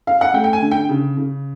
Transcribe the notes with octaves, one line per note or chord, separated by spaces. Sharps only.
F5
F#5
A3 G5
G5
G#5
D3
G5
C#3
C#3